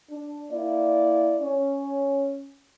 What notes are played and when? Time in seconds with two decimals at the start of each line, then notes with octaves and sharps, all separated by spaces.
0.10 D4
0.50 A#3 E4 D5
1.40 C#4